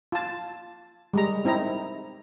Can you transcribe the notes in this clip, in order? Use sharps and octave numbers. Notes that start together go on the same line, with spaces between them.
F4 A5
G3 G#3 A#5
C4 D#4 E4 A#5